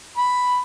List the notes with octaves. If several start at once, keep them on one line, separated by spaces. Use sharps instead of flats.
B5